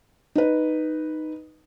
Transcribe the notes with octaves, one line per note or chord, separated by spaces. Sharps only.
D#4 B4